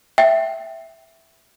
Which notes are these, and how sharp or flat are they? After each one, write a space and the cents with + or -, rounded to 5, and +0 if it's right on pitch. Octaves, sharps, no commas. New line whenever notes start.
E5 +0 G5 -10